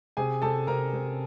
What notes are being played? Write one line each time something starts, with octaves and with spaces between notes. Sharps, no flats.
C3 G#4 G#5
C3 A4 A5
C3 A#4 A#5
C3